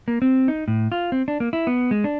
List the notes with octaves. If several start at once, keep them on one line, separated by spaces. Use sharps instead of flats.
A#3
C4
D#4
A2
F4
C4
D4
A#3
E4
B3
G#3
D4